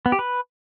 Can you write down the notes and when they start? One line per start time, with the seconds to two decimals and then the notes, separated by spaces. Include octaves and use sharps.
0.06 B3
0.12 G4
0.19 B4